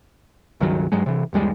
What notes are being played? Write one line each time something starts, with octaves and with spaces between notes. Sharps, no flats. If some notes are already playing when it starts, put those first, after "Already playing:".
C#2 G2 D#3 F#3
G2 F#3 G#3
C3 E3
G1 D#2 G3 G#3